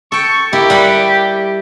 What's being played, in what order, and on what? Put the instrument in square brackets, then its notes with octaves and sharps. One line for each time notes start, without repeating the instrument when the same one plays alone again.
[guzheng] A4 G5 [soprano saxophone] C#6
[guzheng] A#3 E4 [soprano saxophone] G4
[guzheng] G3 F#5 B5